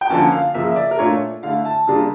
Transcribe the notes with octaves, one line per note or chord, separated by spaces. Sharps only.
G5
D3 F3 A#3 C#4 A5
F5
C#3 F3 A#3 E5
E5
D5
A#4
A#2 A3 D4 F4 C#5
D3 A3 E4 F5
A5
C#3 G3 A#3 D4 F4